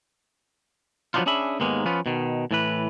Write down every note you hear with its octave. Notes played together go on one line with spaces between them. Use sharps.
F3 F#3 B3 D4 D#4 F4
C#4 D4 G#4 E5 B5
D#2 G#2 D#3 G#3 A#3 B3
F3 B3 C#4 F4 B4
B2 D#3
A2 E3 B4